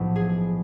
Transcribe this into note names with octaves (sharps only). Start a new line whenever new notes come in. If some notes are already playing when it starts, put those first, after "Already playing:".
Already playing: B1 A2 F3
G#4